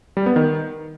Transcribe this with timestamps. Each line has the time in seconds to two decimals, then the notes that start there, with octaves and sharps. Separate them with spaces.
0.17 G3
0.26 B3
0.36 D#3